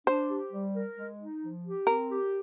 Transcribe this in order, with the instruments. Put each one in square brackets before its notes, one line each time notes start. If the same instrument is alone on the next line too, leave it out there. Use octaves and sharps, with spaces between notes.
[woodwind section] D4 [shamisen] C5
[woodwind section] G4
G3
A#4
G#3
D#4
F3
G4
[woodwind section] C4 [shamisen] A#4
[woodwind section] G4